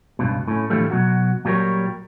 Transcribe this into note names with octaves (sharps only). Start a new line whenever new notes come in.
C#2 G2 B2
A2 C#4
A2 D3 E3 F3 G3 A3
B2 F#3 F#4
A#2 F#3 G3 G#4 A#4 C#5